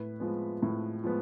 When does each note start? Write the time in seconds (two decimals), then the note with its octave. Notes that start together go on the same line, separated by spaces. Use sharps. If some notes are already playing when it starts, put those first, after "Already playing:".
Already playing: A2 B4
0.20 F3 G#3 B3
0.63 A2
1.03 F3 G#3 B3